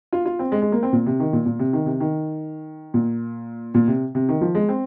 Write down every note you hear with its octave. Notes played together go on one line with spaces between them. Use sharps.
F4
F4
C4
G#3
G#3
A#3
C4
A#2
C3
D#3
A#2
A#2
C3
D#3
C3
D#3
A#2
A#2
C3
C3
D#3
F3
G#3
C4